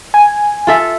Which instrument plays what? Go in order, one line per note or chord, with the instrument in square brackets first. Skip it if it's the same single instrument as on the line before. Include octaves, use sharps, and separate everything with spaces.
[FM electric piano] G#5
[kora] F4 A4 E5